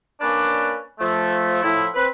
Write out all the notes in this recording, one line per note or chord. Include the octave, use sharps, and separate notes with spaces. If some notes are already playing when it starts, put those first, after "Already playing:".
A#3 C#4 D4 B4 D5
F3 A3
A2 F3 E4
C4 B4